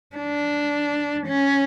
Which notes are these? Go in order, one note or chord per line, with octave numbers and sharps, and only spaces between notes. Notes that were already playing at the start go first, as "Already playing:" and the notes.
D4
C#4